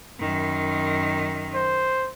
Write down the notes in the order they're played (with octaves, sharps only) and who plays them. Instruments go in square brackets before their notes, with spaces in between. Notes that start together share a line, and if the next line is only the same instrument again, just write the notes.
[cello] F#2 D#3
[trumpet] C5